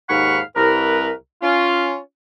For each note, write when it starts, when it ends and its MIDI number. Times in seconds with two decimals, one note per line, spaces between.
0.10 0.40 39
0.10 0.40 44
0.10 0.40 77
0.10 0.40 78
0.10 0.40 83
0.10 0.40 85
0.57 1.10 36
0.57 1.10 70
0.57 1.10 71
1.43 1.97 61
1.43 1.97 65